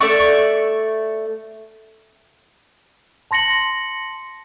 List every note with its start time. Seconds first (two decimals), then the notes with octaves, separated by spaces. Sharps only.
0.01 A3 D5 E5 C#6
3.31 A5 C6 A#6 C#7 F#7